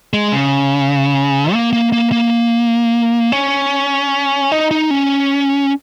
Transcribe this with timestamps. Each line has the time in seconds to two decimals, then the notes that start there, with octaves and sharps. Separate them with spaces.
0.13 G#3
0.32 C#3
1.53 A#3
1.73 A#3
1.92 A#3
2.12 A#3
3.32 C#4
4.52 D#4
4.71 D#4
4.91 C#4